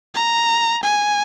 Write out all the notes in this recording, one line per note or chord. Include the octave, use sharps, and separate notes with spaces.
A#5
G#5